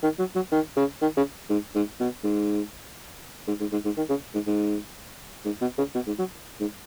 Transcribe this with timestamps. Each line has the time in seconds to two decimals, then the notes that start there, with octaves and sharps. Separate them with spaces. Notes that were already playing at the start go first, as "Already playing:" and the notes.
0.03 D#3
0.19 F#3
0.35 F#3
0.52 D#3
0.77 C#3
1.02 D#3
1.17 C#3
1.50 G#2
1.75 G#2
2.00 B2
2.24 G#2
3.48 G#2
3.60 G#2
3.72 G#2
3.85 G#2
3.97 D#3
4.10 C#3
4.34 G#2
4.47 G#2
5.45 G#2
5.61 B2
5.78 C#3
5.95 B2
6.07 G#2
6.19 F#3
6.61 G#2